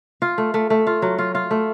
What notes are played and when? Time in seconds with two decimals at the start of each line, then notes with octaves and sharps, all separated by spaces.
0.22 F4
0.38 A3
0.54 A3
0.70 A3
0.87 F4
1.02 F#3
1.18 F4
1.35 F4
1.51 A3